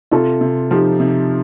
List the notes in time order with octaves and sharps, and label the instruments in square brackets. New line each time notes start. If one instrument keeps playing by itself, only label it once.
[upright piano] C3 [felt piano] F4 A4
[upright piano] C3
[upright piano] F3 [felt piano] D#4 G4
[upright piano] C3